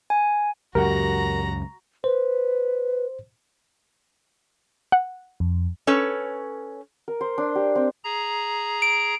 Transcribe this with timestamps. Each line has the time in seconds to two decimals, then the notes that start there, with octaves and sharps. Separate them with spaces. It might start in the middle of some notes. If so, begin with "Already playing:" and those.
0.10 G#5
0.75 C#2 F#2 F#4 G4 A#4 F#5 A#5
2.04 B4 C5
4.92 F#5
5.40 F2
5.87 C#4 A4 B4 C#5
7.08 A#4
7.21 C5
7.38 D4
7.55 G4
7.75 C4
8.04 G#4 A#5
8.82 D7